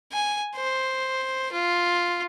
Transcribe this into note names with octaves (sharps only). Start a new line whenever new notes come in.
G#5
C5
F4